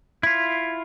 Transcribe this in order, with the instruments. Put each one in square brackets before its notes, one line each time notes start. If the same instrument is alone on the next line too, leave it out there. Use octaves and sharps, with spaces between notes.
[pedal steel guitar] E4 F4 [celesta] G#6 B6